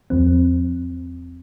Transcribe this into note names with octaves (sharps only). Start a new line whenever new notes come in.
E2 F3 C4